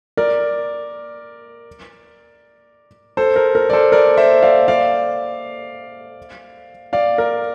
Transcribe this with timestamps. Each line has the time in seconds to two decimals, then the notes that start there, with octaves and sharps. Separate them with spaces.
0.17 A#4 D5
3.17 A4 C5
3.36 A#4
3.55 A#4
3.70 D5
3.73 A4 C5
3.92 A#4 D5
4.17 C5 E5
4.42 D5 F5
4.68 D5 F5
6.93 D5 F5
7.18 A#4